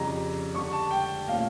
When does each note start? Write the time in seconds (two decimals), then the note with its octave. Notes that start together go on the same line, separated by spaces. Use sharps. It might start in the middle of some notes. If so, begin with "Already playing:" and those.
Already playing: F2 C#3 G3 A#5
0.54 D3 G3 D4 C#6
0.72 A5
0.91 G5
1.28 A#2 A3 C#4 F4 F5